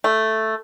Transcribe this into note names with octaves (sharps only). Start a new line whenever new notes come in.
A3